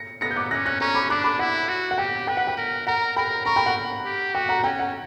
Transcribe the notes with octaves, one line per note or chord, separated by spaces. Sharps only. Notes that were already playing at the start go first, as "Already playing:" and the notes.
Already playing: A#6 C#7
B3 A#6 C#7
G6
D6 F#6
C#4 F#6 A#6
F#6 A#6
C#4 A#5 C#6
B5 D6
D4 D6 F#6
B5 D6
E4 F#5
F#4
F#5
G4 G5
B4 G5
F#5
G5
A#4
A#4 F#5 A#5
A#4 G5 B5
A#4 A#5 C#6
G5 B5
F#5
G4
F#4 G5
F#5 A#5
C#4 G5
F#5